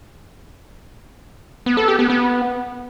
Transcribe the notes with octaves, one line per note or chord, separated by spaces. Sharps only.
B3
A4
G4
B3
B3